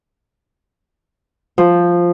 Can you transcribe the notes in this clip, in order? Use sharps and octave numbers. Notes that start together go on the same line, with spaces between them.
F3